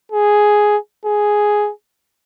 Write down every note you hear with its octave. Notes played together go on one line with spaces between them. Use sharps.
G#4
G#4